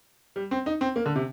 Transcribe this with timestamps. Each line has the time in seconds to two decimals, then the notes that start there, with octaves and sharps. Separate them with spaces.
0.36 G3
0.51 C4
0.66 D#4
0.81 C4
0.96 A#3
1.06 D3
1.16 C3